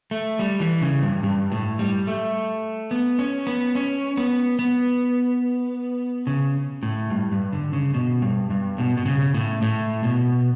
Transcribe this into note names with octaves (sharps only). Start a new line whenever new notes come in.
A3
G3
E3
C#3
G2
G2
A2
G3
A3
B3
C#4
B3
C#4
B3
B3
C#3
A2
G2
G2
D3
C#3
B2
G2
G2
B2
B2
C#3
A2
A2
B2